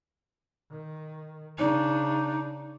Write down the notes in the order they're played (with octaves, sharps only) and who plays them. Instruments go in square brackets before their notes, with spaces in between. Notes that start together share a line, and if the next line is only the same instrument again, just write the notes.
[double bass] D#3
[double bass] C#3 D4 [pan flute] D#4